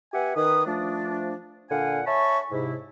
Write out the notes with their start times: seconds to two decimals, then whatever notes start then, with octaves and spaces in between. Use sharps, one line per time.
0.14 B3 G4 E5 F#5 G#5
0.36 D#3 B4 D#6
0.66 F3 A3 D4
1.70 A#2 D3 F5 F#5 G#5
2.07 C#5 E5 G#5 A5 B5 C#6
2.51 G#2 C3 E4